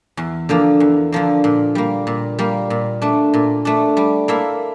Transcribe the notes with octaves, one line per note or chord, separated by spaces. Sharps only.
E2
D3 F3 A#3
E2
D3 F3 A#3
A#2
G3 A#3
A#2
G3 A#3
A#2
A3 D4
A#2
A3 D4
G3
A#3 E4 A4 E5